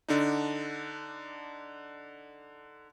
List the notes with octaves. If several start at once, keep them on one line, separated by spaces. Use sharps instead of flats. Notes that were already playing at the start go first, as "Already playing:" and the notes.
D3 D4 D#4